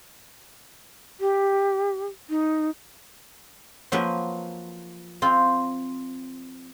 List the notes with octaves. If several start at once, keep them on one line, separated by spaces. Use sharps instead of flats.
G4
D#4
F3 F#3 A#3 B4
C4 F4